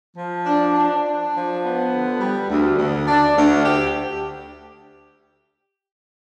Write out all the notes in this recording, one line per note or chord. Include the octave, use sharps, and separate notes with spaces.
F3
D4
D4
D4
F3
B3
D3
G3
D2
D2
D4
D2
G4